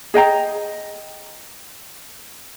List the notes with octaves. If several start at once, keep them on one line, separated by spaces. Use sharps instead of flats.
G#4 D#5 G5 A#5